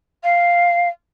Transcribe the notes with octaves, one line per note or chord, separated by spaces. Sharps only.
F5